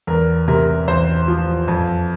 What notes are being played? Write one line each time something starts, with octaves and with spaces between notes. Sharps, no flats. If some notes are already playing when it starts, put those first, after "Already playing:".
E2 A#4
C3 A#4
E2 C5
F3
F2